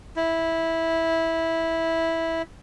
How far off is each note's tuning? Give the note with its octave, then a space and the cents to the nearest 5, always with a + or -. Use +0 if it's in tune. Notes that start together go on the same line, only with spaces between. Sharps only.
E4 -10